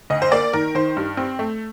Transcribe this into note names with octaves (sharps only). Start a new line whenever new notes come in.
D2 D#5
C5
A#3 D5
D#3 A#4
D#3 C5
G2
C4
A3